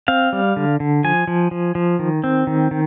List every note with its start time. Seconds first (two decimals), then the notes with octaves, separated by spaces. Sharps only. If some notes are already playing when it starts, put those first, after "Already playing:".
0.08 C4 F5
0.33 G3
0.57 D3
0.80 D3
1.04 F3 G#5
1.28 F3
1.51 F3
1.75 F3
1.99 D#3
2.24 C4
2.47 D#3
2.71 D#3